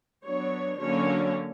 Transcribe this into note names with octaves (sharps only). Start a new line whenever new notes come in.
F#3 B3 D4 C#5
D3 F#3 A#3 C#4 C#5